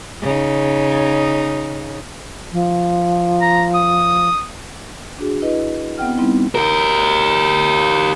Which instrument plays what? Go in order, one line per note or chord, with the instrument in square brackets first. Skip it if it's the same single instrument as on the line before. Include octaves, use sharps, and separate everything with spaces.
[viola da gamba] C#3 D#4
[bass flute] F3
[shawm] A#5
D#6
[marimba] D4 F#4 G#4
E4 B4 D#5
B3 C4 F#5 G5 F6
G3 B3 C4 D#4 E4
[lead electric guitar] G4 A#4